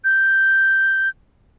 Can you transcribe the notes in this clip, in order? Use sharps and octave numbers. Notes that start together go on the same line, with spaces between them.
G6